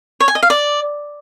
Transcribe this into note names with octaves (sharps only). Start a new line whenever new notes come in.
C#5
G#5
D#5
F5
D5